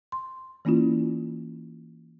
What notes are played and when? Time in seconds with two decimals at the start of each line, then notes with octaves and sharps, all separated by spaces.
0.12 C6
0.65 E3 A#3 C#4 E4 F4